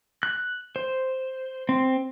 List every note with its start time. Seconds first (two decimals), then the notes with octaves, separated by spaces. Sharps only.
0.23 F#6
0.76 C5
1.69 C4